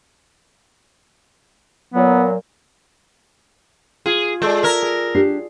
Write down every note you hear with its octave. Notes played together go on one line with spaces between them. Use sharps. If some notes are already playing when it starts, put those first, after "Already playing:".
A#2 F#3 B3
F4 G#4
G#3 A4 D5
A#4 E5 G#6
G#4 D7
D4 G4 C7